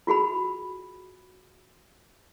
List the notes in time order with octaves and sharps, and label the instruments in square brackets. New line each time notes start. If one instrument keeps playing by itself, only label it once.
[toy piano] F4 F#4 G#4 B5